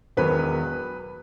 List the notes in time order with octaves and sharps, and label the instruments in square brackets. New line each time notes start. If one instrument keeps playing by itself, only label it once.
[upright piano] E1 E2 D#3 F#3 B3 B4